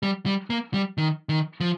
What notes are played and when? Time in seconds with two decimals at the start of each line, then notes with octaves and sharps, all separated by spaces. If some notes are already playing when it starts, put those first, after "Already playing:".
0.03 G3
0.26 G3
0.50 A#3
0.74 G3
0.98 D#3
1.29 D#3
1.60 F3